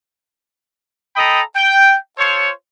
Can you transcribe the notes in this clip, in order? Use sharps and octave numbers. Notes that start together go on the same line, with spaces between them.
A4 D#5 G5 A#5 B5 D#6
G5
F4 A4 C5 C#5